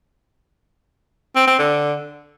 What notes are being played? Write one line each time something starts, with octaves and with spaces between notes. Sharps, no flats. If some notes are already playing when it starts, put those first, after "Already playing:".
C4
C4
D3